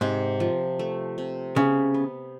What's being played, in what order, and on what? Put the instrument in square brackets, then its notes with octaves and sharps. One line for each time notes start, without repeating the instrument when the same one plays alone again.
[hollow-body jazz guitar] G#2 [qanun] C3
[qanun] F3
A3
C3
[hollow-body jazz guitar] C#3 [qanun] B3
[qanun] B3